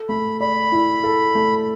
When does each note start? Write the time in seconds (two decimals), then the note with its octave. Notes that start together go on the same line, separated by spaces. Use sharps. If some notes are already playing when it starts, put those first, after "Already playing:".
Already playing: A4
0.09 A3 B5
0.40 D5 B5
0.72 E4
1.03 A4
1.35 A3